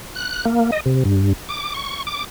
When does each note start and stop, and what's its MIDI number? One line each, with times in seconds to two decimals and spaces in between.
0.15 0.45 90
0.45 0.71 58
0.72 0.80 75
0.86 1.03 48
1.05 1.33 43
1.49 1.74 86
1.74 2.03 85
2.07 2.24 86